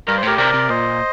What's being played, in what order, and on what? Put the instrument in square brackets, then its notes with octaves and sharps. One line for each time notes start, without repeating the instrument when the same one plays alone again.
[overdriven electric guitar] G2 [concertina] A#4
[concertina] C5
[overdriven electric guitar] A2 [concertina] G4 A#4
[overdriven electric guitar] C3 [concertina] A#4 D5
[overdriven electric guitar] C3
[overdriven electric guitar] A#2 [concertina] C5 D#5